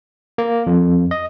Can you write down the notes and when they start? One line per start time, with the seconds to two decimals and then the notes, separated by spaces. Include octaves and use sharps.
0.38 A#3
0.67 F2
1.11 D#5